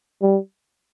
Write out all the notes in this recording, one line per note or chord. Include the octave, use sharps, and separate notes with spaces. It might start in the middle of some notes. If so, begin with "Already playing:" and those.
G3